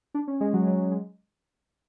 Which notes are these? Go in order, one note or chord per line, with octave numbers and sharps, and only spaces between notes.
D4
C#4
G#3
F#3
F#3
F#3
G#3